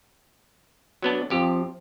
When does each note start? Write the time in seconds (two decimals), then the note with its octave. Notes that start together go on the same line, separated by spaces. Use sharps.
1.02 F#3 B3 D4
1.30 F2 F3 G4